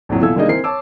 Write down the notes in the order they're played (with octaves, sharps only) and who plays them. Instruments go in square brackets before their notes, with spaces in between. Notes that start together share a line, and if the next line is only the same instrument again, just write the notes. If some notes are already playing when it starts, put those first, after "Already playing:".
[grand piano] A#1 F2 A2 F#3
B2 E3 F4 A4 E6 G#6
G3 G#3 A#3 D4 D#4 D#5
E3 C4 A#4 C7
C#5 A5 D6 E6